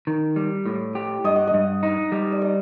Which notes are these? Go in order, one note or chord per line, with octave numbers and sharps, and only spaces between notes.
D#3
G3
A2
G4
G2 D#5
F#5
D#5
G2
D#4
G3
D5
D#5